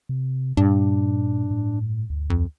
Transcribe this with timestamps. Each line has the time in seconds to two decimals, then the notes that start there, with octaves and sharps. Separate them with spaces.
0.09 C3
0.57 G2 A#2 D4
1.51 A2
2.10 D2
2.30 F2